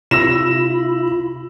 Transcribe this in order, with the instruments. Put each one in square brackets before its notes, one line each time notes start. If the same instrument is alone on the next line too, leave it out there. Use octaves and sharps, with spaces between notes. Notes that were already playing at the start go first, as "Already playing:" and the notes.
[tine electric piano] C3 [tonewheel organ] E4 F4 B5 [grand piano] E6 A#6 E7